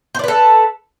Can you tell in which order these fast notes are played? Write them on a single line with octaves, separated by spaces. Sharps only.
C5 D5 B4 A4